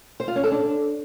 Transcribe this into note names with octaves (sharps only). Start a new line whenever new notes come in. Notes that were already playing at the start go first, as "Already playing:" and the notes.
C5
F4
C#4
A4
D4